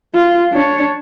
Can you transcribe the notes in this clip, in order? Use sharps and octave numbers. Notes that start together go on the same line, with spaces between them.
F4
D4 C#5